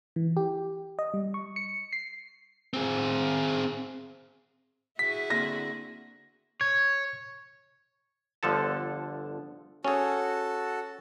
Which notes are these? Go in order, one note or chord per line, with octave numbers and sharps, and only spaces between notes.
E3
G4
D#5
G3
C#6
C#7
C7
C4 G#4
E4 F#4 G#4 B6
D3 A#3 C4 A#6
C#5 G#6
G1 D3 F3 A4 A5
C#4 F#4 G#4 A4